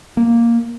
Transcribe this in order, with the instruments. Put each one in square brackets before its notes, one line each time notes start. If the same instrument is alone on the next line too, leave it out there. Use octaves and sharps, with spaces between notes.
[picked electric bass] A#3